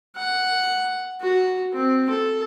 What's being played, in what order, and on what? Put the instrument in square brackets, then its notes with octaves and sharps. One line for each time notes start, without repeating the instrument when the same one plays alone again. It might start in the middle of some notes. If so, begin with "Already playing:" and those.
[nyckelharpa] F#5
F#4
C4
A4